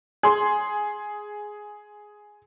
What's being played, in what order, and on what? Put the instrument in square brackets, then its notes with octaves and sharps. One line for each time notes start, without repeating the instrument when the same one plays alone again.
[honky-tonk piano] G#4 C6